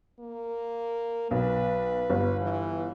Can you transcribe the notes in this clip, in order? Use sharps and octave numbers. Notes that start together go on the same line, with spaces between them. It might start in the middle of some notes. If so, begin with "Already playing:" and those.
A#3
B1 B4
G1
E3